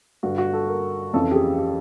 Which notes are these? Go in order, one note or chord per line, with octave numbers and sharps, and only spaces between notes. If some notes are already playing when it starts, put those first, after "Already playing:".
G2 D3 F#4
F#4
A4
A#4
F2 C#3 E3 A4
G4
G#4
G4